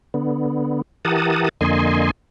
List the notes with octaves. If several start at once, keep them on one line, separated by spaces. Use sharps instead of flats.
D3 B3
E3 G4 A#4 F#5 A5 D#6
F2 D3 A#3 D#5 G#5 C6